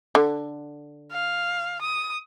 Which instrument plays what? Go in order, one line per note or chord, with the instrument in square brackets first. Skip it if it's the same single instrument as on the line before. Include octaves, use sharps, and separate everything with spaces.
[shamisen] D3
[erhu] F5
D#6